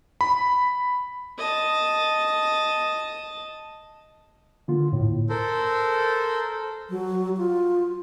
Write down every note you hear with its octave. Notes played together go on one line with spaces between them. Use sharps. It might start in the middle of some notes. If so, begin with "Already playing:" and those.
B5
D#5 A5
D3 A#3 F4
D2 A2
A4 A#4 C5
F#3
F4